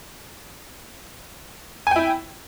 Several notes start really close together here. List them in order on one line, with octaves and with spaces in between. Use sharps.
G#5 G5 E4